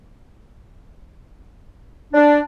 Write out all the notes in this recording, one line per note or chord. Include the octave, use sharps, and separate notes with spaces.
D4